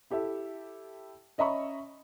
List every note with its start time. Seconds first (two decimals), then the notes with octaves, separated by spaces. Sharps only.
0.11 E4 G4 A4 E5
1.38 C#4 D#5 E5 A#5 B5 C#6